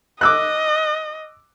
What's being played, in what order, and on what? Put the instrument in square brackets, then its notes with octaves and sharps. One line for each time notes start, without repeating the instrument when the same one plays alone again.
[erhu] D#5 [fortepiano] D6 E6 F#6